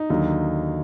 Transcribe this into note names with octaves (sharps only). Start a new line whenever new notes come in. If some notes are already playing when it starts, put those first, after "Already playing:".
Already playing: D#4
D#2 D3 F#3